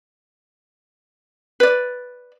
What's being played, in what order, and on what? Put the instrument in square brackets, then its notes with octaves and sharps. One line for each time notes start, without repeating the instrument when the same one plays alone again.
[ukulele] B4 D5